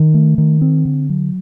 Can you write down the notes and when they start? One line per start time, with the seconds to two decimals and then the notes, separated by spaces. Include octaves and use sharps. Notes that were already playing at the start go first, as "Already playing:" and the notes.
Already playing: D#3
0.14 A3
0.38 D#3
0.61 C4
0.85 D3
1.09 F#3